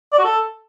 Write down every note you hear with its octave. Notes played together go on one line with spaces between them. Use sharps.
D5
F#4
A4